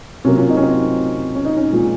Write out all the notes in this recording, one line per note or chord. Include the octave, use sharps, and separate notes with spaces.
C3 F#3 A#3 C#4
C#4 F4
C4 D#4
C#4
C4 D#4
C#4
D#4
C#4
A#2 F3 G#3